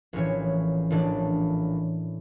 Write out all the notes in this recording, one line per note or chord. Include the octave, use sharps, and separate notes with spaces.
A#1 A2 E3 C#4 C#5
A#1 A2 E3 D4 D5